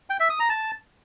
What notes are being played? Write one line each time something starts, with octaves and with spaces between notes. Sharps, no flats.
G5
E5
D#6
A#5
A5